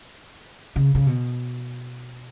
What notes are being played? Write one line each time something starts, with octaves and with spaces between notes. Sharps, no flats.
C#3
C#3
B2